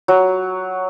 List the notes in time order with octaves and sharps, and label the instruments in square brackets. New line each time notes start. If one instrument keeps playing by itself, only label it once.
[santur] F#3